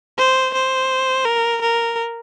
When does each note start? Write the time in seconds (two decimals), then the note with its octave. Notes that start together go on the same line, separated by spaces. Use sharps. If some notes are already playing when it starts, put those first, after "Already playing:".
0.18 C5
0.54 C5
1.26 A#4
1.61 A#4